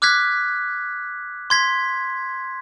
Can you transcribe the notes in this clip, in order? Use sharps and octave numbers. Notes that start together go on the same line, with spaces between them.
D6 F6 F#6 G#6 B6
C6 G#6 B6